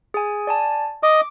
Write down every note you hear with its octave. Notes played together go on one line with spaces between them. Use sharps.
G#4 G#5
D5 G#5 A5
D#5 D6